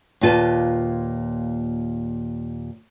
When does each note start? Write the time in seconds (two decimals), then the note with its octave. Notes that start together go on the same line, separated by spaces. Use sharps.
0.21 D#2 A#2 F4 B4 A5